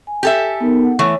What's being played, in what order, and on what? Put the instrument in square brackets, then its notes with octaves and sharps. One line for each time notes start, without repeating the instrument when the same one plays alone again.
[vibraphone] G#5
[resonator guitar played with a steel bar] G4 A4 E5
[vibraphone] B3 D#4 A#4
F#5
[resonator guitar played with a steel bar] E3 A3 [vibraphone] C#5